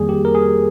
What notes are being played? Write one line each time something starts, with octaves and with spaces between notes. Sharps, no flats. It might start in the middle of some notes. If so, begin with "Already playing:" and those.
Already playing: F2 D#3 G3 A#3 G#4
G4
A#4
G#4